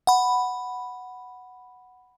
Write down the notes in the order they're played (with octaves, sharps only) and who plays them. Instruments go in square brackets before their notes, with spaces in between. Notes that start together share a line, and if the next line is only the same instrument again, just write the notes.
[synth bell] F#5 B5